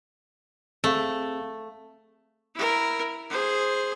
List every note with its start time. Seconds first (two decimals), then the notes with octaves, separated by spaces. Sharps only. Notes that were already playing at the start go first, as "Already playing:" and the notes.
0.84 A3 C4 G#4 F5
2.55 E4 A#4
3.29 G#4 C5